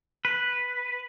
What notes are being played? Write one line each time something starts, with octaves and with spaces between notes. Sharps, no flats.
B4